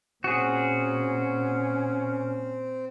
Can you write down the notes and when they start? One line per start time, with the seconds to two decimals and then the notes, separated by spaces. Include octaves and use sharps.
0.24 A#2 C4 C#4 F#4 G#4